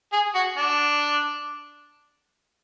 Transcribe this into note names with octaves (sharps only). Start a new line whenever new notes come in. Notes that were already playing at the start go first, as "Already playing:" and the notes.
G#4
F#4
D4